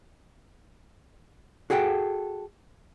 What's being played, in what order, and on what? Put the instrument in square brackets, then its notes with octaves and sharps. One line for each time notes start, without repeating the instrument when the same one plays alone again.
[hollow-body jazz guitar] F#4 G#4 A4 F#5 G5